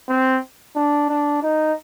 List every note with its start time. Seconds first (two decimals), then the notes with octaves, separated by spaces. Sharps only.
0.09 C4
0.76 D4
1.09 D4
1.43 D#4